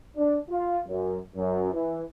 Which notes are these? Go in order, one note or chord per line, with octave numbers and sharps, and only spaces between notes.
D4
F4
F#2
F#2
E3